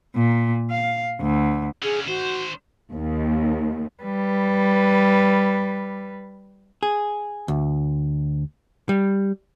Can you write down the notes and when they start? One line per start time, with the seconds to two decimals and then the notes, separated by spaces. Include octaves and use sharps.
0.16 A#2
0.71 F5
1.21 D2
1.83 D3 C#4 G#4
2.07 D#3 F#4 C5
2.92 D#2
4.03 G3 B4
6.83 G#4
7.48 D2
8.89 G3